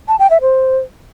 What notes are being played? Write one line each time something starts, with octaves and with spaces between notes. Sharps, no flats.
A5
G5
E5
C5